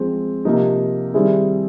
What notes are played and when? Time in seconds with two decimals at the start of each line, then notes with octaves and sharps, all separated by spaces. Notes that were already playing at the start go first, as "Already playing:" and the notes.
Already playing: F3 G#3 C4
0.45 C3 F3 A#3 D#4
1.14 D#3 G3 C4 E4 G#4